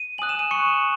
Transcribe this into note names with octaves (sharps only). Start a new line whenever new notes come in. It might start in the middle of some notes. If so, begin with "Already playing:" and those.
Already playing: D#7
G#5 D#6 F#6 F#7
E7
D#7
C#6 C#7